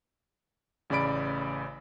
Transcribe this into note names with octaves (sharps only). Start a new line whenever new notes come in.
A1 C#3 D5 B5 D7